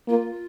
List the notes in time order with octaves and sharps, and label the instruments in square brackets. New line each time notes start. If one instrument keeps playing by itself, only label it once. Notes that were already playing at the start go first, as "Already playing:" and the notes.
[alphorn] A#3 [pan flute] F4